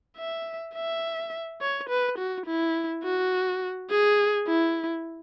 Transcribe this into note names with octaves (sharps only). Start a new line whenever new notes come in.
E5
E5
C#5
B4
F#4
E4
F#4
G#4
E4